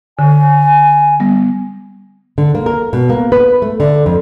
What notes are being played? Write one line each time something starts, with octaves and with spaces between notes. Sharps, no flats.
D3 G#5
G3 B3
D3
A#3
A#4
B2
A#3
B4
A3
D3
F2